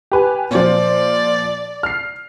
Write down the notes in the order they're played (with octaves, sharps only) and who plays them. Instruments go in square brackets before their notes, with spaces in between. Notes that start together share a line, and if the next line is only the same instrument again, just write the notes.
[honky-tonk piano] G4 B4 G#5
[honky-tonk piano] A#2 F3 [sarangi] D5
[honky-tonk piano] F6 C7